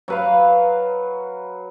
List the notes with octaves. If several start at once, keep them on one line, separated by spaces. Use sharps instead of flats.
F#3 B4 F5